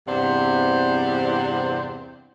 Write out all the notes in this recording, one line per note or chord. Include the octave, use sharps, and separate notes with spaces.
E2 G2 C3 C5 D5 F#5